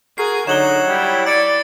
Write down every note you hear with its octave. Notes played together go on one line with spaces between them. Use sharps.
F#4 G#4 A#4 C7
D3 F#3 D#4 C#5 F#5 E7 F#7 G7
G3 E4
D5 A6 C#7 D7